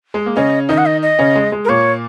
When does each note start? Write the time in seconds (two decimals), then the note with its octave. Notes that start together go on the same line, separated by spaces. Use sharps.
0.14 G#3
0.26 A#3
0.36 C#3 C#4 D#5
0.69 D#3 D#4 D#5
0.78 F#5
0.86 D#5
1.02 D#5
1.19 C#3 C#4
1.36 G#3
1.52 G#3
1.65 A#4
1.69 A#2 A#3 C#5